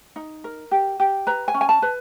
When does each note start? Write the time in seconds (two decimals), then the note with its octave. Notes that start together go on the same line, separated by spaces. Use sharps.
0.16 D#4
0.44 A#4
0.71 G4
1.00 G4
1.27 B4 A#5
1.48 G#5
1.54 C#4
1.61 G#5
1.69 A5
1.82 B4